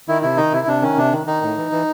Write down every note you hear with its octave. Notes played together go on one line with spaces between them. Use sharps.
D#3 E4
C3 E4
D#3 D#4
C3 E4
C3 D4
D#3 C#4
C3 D4
D#3
D#3 D#4
A2
E3
E3